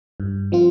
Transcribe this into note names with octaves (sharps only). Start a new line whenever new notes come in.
G2
F3 C4 F4